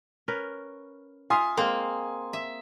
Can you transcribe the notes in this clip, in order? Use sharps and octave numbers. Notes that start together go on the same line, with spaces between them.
C#4 A#4 B4
F4 E5 F5 G#5 C6 D#6
G#3 A#3 C4 C5
E5